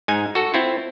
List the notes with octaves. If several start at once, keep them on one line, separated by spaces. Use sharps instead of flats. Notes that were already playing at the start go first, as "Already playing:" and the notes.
G#2 D#4 G#5
F#4 A4
C4 E4 F4